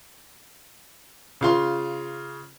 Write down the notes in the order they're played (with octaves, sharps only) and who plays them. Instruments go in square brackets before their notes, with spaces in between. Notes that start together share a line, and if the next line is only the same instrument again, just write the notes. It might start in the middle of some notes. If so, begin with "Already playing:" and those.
[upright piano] C#3 F4 C6